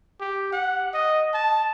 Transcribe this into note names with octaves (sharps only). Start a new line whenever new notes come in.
G4
F#5
D#5
A5